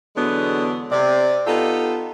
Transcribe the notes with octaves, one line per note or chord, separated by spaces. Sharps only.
E2 D3 F#3 G#3 B3 D4
C3 D5
B3 D#4 F4 G4 A4